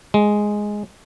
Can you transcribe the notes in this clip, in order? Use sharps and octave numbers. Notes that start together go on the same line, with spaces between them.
G#3